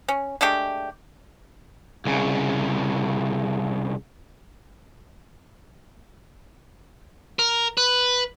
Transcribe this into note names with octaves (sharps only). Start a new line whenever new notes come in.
C#4
G#3 A3 D4 G4
C2 C#3
A#4
B4